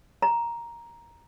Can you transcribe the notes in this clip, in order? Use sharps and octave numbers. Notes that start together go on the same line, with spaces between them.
A#5